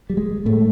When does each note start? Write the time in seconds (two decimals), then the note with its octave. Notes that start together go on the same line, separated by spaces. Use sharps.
0.10 G3
0.17 G#3
0.45 A2 A3